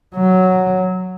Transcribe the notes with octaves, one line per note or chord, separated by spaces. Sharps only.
F#3